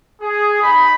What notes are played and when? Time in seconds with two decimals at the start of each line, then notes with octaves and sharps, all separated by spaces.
0.21 G#4
0.61 D#4 B5